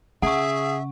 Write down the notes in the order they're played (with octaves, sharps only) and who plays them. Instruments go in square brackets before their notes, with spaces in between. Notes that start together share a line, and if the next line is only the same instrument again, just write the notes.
[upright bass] C#3 [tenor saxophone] G#4 [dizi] E5 [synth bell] F#5 C#6